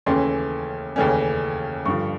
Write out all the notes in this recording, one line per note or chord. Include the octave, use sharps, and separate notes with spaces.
D#2 C#3 E3 A3 C#4 C6
D#2 C#3 E3 A3 C#4
G2 D3 F3 C#6